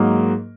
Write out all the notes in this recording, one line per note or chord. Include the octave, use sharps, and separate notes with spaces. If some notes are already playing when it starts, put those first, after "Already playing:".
Already playing: G#2 F#3 A#3 D#4 A#4